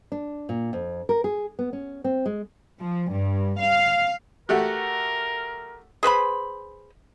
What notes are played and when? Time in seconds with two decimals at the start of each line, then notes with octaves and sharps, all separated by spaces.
0.12 D4
0.49 A#2
0.73 F2
1.09 A#4
1.24 G#4
1.59 B3
1.73 C#4
2.04 C4
2.26 G#3
2.81 F3
3.10 G2
3.59 F5
4.49 A3 F#4 G4 A#4
6.03 G#4 B4 C5 B5